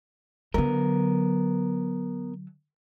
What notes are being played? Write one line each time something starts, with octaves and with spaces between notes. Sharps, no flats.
D3 F#3 B3 A#4